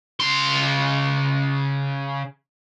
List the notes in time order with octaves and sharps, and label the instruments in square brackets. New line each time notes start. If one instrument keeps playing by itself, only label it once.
[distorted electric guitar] C#3 C6